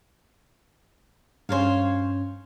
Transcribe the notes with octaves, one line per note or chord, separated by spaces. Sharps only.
G2 C#4 C5 C#5 F5